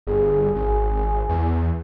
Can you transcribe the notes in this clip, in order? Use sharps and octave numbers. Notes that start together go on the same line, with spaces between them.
G1 G#4
G#1
E2